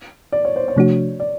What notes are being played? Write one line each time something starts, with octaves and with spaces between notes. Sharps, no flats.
D5
C#5
C5
C#5
C3 F3 A3 D4 F#4
D5